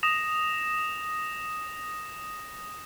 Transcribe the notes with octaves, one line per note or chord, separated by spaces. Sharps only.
D#6 A#6 E7 F7